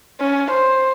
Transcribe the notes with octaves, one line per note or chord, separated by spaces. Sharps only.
C#4
C5